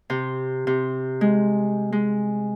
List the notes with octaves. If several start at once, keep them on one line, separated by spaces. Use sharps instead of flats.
C3
C3
G#3
G#3